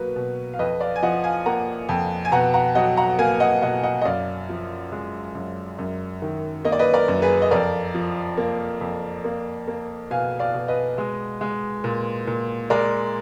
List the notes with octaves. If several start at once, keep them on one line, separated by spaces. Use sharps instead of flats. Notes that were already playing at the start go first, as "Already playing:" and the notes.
Already playing: B2 F#3 A#3 B4
B2
F5
F2 B4 D#5
D5 F5
G#5
F3 D#5 F#5
F5 G#5
A#3 F#5 A#5
F2
G#5
B2 F#5 A#5
F#5 A#5
F#3 D#5 F#5
F#5 A#5
A#3 F5 G#5
D#5 F#5
B2 D#5 F#5
D#5 F#5
D#5
F#2 D5 F5
F3
G#3
F#2
F#2
D#3
A#3 D#5
D5
B4 D#5
A#4 D5
F#2
G#4 B4
D#5
F2 A#4 D5
F3
A#3
F2
A#3
A#3
B2 F5 G#5
D5 F5
B2
B4 D#5
G#3
G#3
A#2
A#2
G#3 A#4 D5